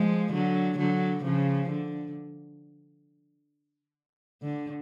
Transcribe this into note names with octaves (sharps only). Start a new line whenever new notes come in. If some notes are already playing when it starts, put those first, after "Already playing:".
Already playing: F3 G#3
D3 F#3
D3 F#3
C#3 F3
D3
D3